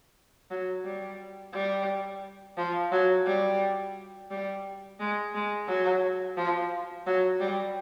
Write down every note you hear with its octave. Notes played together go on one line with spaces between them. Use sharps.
F#3
G3
G3
F3
F#3
G3
G3
G#3
G#3
F#3
F3
F#3
G3